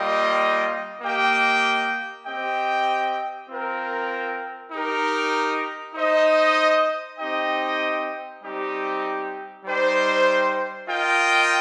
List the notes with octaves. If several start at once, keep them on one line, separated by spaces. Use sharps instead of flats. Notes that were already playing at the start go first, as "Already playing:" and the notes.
Already playing: G3 A#3 F4 D#5 G5
A#3 G4 D#5 G5
C4 G4 D#5 G5
C4 F4 A#4 G5
D#4 G4 A#4
D#4 C5 D#5
C4 D#4 G4 D#5 G5
G3 C4 D#4 G4
G3 D#4 C5 G5
F4 A#4 D#5 G5